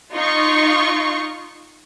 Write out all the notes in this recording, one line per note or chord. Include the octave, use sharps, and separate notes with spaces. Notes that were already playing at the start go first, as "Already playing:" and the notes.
D#4 F4 C#6